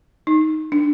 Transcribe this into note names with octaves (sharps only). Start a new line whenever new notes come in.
D#4
D4